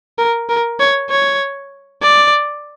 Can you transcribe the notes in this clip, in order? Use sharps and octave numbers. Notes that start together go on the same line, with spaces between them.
A#4
A#4
C#5
C#5
D5